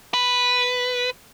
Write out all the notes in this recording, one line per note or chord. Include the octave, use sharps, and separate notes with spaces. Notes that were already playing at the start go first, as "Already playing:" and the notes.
B4